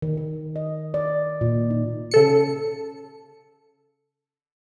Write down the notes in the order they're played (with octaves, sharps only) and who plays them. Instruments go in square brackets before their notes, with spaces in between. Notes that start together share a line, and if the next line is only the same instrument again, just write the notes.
[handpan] D#3
D#3
D#5
D5
A#2
D#4
[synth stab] C#3 A4 C#7